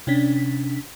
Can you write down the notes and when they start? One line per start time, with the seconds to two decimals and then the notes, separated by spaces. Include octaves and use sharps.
0.07 C3 C#4 D4 B6